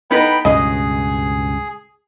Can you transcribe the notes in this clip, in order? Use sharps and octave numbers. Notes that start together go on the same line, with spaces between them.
B3 D#4 B4 G5 B5
C#2 G2 B2 G#4 D#5